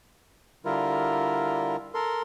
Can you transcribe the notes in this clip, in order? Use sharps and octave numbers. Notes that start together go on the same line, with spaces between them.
D3 G3 E4 F4 A#4
A4 A#4 C6